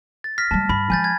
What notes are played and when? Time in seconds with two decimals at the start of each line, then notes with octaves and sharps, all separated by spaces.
0.24 A6
0.38 F6 A#6 B6
0.51 G3 G#3 A5
0.69 G2 B5
0.90 F3 G#3 G#5 G6 A6
1.04 G#6